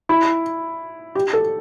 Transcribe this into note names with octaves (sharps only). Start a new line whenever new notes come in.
E4
G4
A4